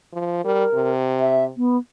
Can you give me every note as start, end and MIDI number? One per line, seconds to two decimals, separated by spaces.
0.13 0.41 53
0.45 0.64 55
0.45 0.91 70
0.74 1.50 48
1.20 1.45 76
1.57 1.77 59